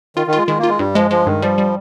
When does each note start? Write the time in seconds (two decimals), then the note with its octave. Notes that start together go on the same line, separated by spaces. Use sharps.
0.16 D#3 F4
0.27 D#3
0.33 G#3 F4
0.47 D#3 G#3
0.59 A#3 F4
0.69 G#3
0.79 G2 G3
0.95 F3 G#3
1.11 F3 G#3
1.26 G2 D#3
1.42 F3 G3
1.58 G3